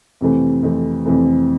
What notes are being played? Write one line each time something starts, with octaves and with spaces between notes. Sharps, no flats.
F2 C3 E3 A3 C4
F2 C3 E3 A3 C4
F2 C3 E3 A3 C4